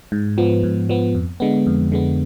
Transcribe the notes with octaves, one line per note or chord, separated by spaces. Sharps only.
G#2
F3 B3
G#2
F3 B3
F2
D3 G#3 B3
F2
D3 G#3 B3